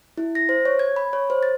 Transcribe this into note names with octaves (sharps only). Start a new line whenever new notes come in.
E4
A#6
C5
C#5
G#6
B5
C#5
C5
A6